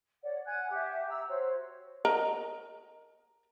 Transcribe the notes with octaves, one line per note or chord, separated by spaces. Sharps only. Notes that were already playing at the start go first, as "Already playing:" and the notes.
C#5 D5 F#5
F#5 G#5 F#6 G#6
G4 E5 F#5
A#5 E6
F#4 C5 C#5
A#4 D#5 A#5